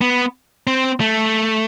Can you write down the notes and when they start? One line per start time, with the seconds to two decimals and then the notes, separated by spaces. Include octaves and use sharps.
0.01 B3
0.67 C4
1.00 A3